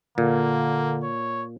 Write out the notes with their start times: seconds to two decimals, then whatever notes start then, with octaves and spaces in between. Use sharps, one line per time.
0.18 A#2 D3 A#3
1.03 C#5